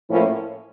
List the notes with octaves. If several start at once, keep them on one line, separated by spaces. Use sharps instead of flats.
A2 F3 A#3 C#4 E4